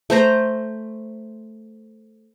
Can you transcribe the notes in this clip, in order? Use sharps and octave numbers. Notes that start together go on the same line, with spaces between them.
A3 C5 A#5